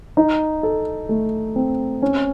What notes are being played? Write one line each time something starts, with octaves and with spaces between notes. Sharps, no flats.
D#4
A4
A3
C4
C#4